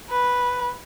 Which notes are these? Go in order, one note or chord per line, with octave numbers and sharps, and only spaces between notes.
B4